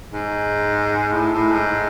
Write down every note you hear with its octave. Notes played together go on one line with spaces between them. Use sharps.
G#2
A2
A2
G#2